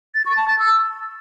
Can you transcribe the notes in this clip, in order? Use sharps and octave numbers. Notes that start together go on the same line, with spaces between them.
A6
C#6
A5
A6
E6